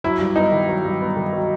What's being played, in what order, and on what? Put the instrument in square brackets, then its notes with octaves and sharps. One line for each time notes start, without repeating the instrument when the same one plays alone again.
[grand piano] F#3 [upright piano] E4
[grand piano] G2
[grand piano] B3 [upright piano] D#4
[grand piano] D#3
F#3
G2
B3
D#3
F#3